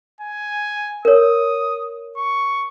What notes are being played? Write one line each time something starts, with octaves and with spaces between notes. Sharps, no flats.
G#5
A#4 C#5 D#6
C#6